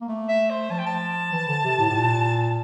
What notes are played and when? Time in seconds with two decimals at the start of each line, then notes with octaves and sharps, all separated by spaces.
0.01 A#3
0.08 A3
0.29 E5
0.50 C5
0.71 F3 A5
0.78 G5
0.86 A5
1.33 E3
1.48 D3
1.64 C3
1.79 A2
1.90 A2
1.95 A#2